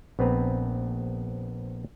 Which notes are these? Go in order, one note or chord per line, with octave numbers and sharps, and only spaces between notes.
A#1 B3 C4 B4 A#5